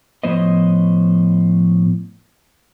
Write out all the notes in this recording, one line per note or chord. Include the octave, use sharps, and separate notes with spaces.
A2 F3 B3 C5 C#5 D#5